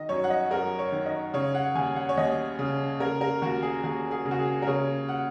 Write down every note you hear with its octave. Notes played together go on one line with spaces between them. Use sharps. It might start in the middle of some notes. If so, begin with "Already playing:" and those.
Already playing: D#3 D#5
F#2 C#5
F#5
D#5
F#2 A#4
C#5
D#3
D#5
C#3 C#5
F#5
D#2 G#5
F#5
C#5
D#2 D#5
C#3
C#3 A#4
A#4
D#2 F#4
G#4
D#2 G#4
G#4
C#3
F#4
G#4
A#4
C#3 C#5
F#5